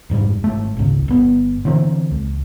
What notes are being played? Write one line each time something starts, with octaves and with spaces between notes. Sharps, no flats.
F1 G#2 G3
G#1 A3
G#1 C#2
G1 B3
D3 E3 A#3 C4
C#2